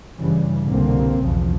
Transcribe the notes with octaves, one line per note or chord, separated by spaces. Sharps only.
G2 C#3 E3 G3
C2 B2 D3 A#3 C4
B1 E2 C#3 F3